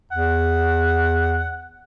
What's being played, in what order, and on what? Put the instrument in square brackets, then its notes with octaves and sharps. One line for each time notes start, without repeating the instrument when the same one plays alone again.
[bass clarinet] E2 [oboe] F#5